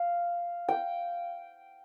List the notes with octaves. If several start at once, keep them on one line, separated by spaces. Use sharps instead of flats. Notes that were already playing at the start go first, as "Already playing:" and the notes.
Already playing: F5
G5